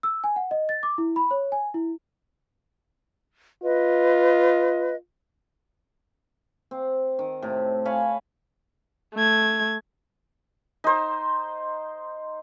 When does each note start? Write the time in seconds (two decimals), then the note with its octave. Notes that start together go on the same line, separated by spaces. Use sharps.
0.03 E6
0.24 G#5
0.36 F#5
0.51 D#5
0.69 A6
0.83 D6
0.98 E4
1.16 B5
1.31 C#5
1.52 G#5
1.74 E4
3.63 F4 B4 D#5
6.71 C4
7.19 D#3
7.42 A2 C3
7.85 C#5 F5 G#5 B5
9.14 A3 G#6
10.84 D#4 C5